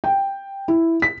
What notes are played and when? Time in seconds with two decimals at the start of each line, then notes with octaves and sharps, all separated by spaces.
0.04 G5
0.68 E4
1.02 B6